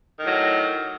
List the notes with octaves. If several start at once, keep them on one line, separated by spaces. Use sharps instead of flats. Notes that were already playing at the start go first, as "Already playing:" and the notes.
A2 D#3 F#3